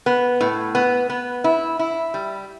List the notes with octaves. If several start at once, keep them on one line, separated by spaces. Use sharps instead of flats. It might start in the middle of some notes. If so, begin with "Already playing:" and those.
B3
A2
B3
B3
E4
E4
G3